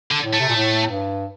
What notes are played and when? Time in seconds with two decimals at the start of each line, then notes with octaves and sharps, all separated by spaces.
0.11 D3
0.22 A2
0.34 A3
0.40 C3
0.49 A#2
0.56 A2
0.90 G2